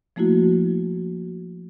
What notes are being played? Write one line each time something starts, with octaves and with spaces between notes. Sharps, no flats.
F3 A3 A#3 E4 F#4